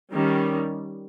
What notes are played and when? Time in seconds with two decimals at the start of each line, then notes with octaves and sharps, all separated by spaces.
0.11 D#3 G3 C#4